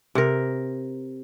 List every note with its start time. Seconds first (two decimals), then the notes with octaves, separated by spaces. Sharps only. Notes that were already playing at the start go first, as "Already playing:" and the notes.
0.15 C3 A#4